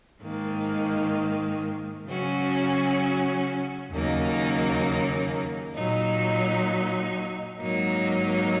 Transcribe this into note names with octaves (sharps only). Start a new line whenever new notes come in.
G#2 D#3 A#3
C#3 F#3 C#4 F#4
D#2 C#3 F#3 A#3 D#4
A#2 F#3 D#4
G#2 F#3 A#3 D#4